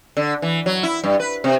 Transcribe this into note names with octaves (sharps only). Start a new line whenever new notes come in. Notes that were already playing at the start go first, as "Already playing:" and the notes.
D3
E3
F#3
E4
G2
B4
C3